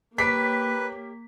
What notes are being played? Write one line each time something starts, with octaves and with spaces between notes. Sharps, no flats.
A#3 G4 B4 C#5 B6